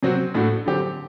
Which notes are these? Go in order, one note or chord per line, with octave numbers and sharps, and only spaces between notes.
C3 F#3 C4 F#4
A2 A3 D4 F#4
D3 F#3 C4 G4